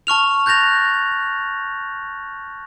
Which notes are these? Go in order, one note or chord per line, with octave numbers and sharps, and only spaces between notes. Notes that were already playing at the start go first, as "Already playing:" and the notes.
A5 C#6 F6 F7
F#6 G6 A6 A#6 F7